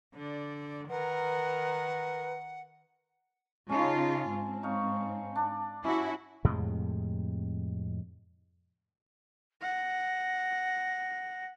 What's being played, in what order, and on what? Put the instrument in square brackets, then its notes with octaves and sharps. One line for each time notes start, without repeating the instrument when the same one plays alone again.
[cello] D3 D5
[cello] D#3 A#4 [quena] B4 [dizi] F#5
[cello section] C#3 D#4 F4 [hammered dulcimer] C#4 A5
[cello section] G#2 C4
[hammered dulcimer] D#4 C#5 F5
D4
[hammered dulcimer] G3 C#4 [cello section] E4 F#4
[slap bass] F2 A2 C3 G#3
[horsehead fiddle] F#5 [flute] A#6